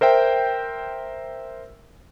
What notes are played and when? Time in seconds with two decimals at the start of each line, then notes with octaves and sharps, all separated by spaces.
0.01 A#4 C5 E5 G5